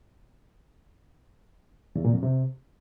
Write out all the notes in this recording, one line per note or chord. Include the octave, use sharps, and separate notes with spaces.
E2
A#2
F2
C3